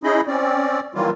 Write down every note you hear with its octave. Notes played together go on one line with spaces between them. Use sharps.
C#4 D#4 E4 G#4 D#5 B5
C4 C#4 D5
D#3 E3 F#3 G3 A#3 F4